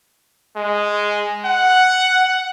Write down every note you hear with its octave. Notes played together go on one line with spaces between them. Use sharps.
G#3
F#5